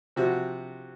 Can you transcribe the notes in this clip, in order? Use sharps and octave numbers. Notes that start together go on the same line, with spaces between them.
C3 F3 F#4